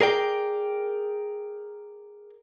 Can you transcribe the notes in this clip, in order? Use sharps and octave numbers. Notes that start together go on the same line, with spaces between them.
G#4 A#4 D5 G5